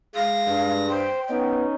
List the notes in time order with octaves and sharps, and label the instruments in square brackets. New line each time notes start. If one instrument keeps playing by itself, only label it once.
[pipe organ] G#3 A#6 [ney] F5
[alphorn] G2
[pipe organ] C5 [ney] G5
[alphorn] B3 [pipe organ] C#4 D#4